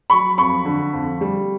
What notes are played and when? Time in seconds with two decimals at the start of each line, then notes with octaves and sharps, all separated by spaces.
0.10 F#3 B5 C#6
0.38 F2 B5 C#6
0.65 D3
0.93 F2
1.21 G3